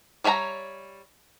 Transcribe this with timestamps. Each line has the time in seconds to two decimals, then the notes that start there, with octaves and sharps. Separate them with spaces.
0.24 G3 C#5 E5 G#5 A#5